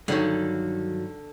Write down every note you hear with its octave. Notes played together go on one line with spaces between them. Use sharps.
G2 D3 D#3 F#3